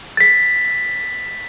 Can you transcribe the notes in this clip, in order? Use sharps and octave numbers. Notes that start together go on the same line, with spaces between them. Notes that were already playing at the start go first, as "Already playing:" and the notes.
A6 B6